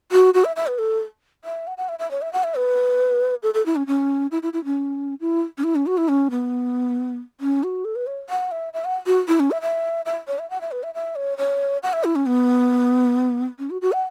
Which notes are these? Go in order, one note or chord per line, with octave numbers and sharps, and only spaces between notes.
F#4
F#4
E5
E5
B4
A4
E5
F#5
F#5
E5
E5
C#5
E5
F#5
E5
B4
A4
A4
E4
C#4
C#4
E4
E4
E4
C#4
E4
C#4
E4
C#4
F#4
E4
C#4
B3
C#4
F#4
A4
B4
C#5
F#5
E5
E5
F#5
F#4
E4
C#4
E5
E5
E5
C#5
E5
F#5
E5
B4
E5
E5
C#5
C#5
F#5
E5
E4
C#4
B3
C#4
F#4
F#4
F#5